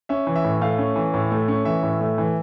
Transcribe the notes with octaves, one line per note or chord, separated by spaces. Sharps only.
C#4 E5
E3
E5
A2
A3 F5
C#4
E3
A2
A3
C#4
E3 E5
A2
A3
E3